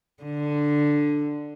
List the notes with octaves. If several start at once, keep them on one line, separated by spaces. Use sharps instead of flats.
D3